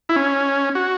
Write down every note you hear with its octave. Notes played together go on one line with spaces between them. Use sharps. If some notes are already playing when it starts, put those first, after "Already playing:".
E4
C#4
F#4